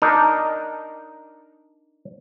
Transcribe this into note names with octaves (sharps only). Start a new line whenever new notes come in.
D4 D#4 A#4